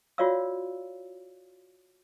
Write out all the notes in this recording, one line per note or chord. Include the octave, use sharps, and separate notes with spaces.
F4 F#4 C#5 D5 F5 E6